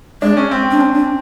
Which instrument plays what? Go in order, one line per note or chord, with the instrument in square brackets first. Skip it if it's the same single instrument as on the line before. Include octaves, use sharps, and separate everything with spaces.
[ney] G#3 [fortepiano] D4
[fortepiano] C#4
C4
[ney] D4
C#4
D4